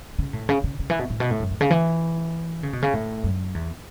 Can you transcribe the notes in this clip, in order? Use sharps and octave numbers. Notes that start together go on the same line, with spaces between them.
C#3
A2
C#3
C#3
C#3
E3
B2
A2
B2
A2
F#2
A2
C#3
E3
C#3
B2
C#3
A2
F#2
E2